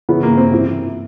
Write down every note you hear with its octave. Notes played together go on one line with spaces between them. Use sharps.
C#3 E3 B3
A#3
C4
C3 E3